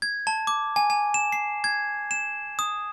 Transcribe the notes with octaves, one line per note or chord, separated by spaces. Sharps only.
G#6
A5
D6
G#5
G#5
E7
C7
G#6
E7
D#6